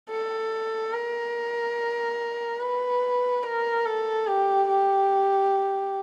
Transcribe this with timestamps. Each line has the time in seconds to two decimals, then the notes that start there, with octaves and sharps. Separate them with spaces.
0.11 A4
0.93 A#4
2.60 B4
3.43 A#4
3.86 A4
4.27 G4
4.68 G4